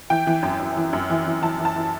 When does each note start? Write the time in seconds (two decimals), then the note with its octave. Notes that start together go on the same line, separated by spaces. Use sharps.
0.10 E3 G5
0.27 E3
0.43 F#2
0.59 F#2
0.77 E3
0.93 F#2
1.10 E3
1.26 E3
1.42 E3 A5
1.60 E3
1.65 A5
1.76 E3